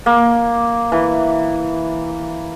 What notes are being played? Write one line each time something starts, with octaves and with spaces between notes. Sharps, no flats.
A#3
E3